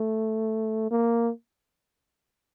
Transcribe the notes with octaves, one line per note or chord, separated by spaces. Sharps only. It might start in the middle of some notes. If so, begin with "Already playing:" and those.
Already playing: A3
A#3